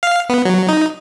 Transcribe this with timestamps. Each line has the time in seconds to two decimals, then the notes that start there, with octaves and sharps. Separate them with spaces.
0.03 F5
0.29 B3
0.45 F#3
0.69 D#4